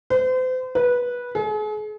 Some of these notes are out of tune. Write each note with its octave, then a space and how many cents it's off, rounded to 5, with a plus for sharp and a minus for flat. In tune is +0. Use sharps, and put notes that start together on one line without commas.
C5 -40
B4 -15
G#4 +40